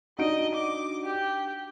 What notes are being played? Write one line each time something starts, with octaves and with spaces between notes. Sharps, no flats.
D4 D#4 F#4 D#5 D7
D6
G4 G5